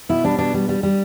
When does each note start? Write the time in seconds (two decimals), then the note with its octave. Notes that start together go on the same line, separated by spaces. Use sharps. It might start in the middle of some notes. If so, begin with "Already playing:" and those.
0.09 B2 E4
0.24 G3 D4
0.39 B2 D4
0.54 G3
0.69 G3
0.83 G3